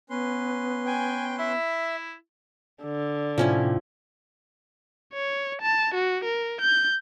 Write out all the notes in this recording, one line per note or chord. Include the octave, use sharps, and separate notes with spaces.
B3 C#4 B4 C6
G5 G#5
E4 E5
D3
A2 C3 F3 C#4 E4 G5
C#5
A5
F#4
A#4
G6